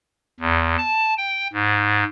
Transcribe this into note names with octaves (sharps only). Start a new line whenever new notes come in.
E2
A5
G5
G#2